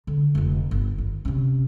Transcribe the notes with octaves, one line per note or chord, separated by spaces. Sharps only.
D3
F1 F4
G1
D#3
C3 C#4